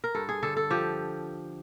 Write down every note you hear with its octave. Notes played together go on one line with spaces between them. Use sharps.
A#4
G2 A4
G#4
D3 A4
A4
F3 G4